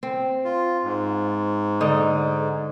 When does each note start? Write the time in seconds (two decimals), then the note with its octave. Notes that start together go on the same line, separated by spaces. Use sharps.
0.03 C4
0.45 F4
0.84 G#2
1.81 D3 D#4